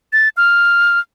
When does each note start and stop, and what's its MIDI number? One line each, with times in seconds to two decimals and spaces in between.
0.13 0.29 93
0.37 0.99 89